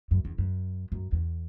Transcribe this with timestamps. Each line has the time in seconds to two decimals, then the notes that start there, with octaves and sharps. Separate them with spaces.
0.11 F#2
0.25 E2
0.38 F#2
0.92 F#2
1.12 E2